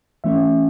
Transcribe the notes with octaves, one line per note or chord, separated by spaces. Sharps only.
E3 A3 C#4 E5